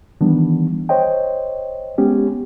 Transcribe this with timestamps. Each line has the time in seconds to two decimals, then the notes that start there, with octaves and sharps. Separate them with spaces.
0.21 D#3 E3 G3 B3 D4
0.89 C5 C#5 D#5 G5
1.98 G#3 B3 C#4 G4